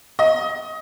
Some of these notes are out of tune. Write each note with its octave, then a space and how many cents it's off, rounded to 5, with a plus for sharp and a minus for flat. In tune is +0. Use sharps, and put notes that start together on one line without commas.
D#5 +25